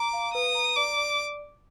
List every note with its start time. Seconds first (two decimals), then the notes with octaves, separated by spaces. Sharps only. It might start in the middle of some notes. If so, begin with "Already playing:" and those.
Already playing: A#5 D6
0.13 F5
0.34 B4 D#6
0.55 A#5
0.76 D5 D6
0.97 D5